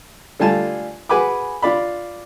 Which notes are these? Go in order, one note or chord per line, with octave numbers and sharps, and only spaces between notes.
D3 G3 A3 F4 G#5 A5
F#4 G#4 B4 G#5 B5 D6
D4 F4 D5 B5